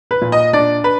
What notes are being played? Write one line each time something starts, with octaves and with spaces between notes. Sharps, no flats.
B4
A#2
D#5
D4 D5
B4